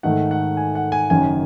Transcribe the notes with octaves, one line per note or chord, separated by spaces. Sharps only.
G#2 D#3 A3 D#4 F#5
F#5
G#5
F#5
G#5
F#1 F#2 D#3 G#5